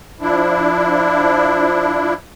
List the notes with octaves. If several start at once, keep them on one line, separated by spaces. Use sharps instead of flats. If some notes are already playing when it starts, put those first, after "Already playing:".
F3 D4 E4